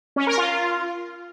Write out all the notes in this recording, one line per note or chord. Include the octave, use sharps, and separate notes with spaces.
C#4
A#4
F4